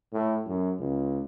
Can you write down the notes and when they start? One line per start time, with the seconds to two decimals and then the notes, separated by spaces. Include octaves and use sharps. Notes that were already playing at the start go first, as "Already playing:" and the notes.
0.13 A2
0.46 F#2
0.79 C#2